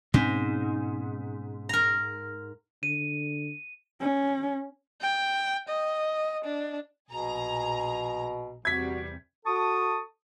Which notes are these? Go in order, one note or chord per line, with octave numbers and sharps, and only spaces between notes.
G#2 B2 C4 C#4
A#4 A#5
D3 D#7
C#4
G5
D#5
D4
A#1 B2 G#4 A#5
E2 C3 G3 F#4 G#6 B6
F#4 A4 A5 C#6 D#6